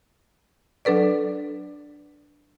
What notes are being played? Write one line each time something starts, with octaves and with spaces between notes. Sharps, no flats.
F#3 D4 A4 B4 D5